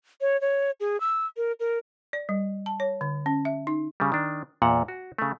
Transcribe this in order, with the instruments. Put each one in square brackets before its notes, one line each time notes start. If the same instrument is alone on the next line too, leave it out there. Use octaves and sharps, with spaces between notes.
[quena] C#5
C#5
G#4
E6
A#4
A#4
[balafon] D5
G3
A5
C#5
D3
C#4
E5
D#4
[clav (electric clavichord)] C#3 G3
D#3 D4
E2 A#2 F#5
F#4
C#3 A3